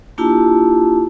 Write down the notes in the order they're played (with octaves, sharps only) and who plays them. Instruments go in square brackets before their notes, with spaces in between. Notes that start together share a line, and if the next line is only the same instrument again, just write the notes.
[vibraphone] A#3 D4 E4 F4 G4 A5